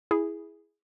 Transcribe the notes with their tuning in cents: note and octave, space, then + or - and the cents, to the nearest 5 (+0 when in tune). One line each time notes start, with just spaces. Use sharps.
E4 +0 G#4 +0